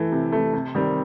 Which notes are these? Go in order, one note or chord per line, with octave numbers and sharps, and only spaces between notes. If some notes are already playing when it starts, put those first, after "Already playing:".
Already playing: E3 A3
C3
E3 A3
C3
D#3 G3 C4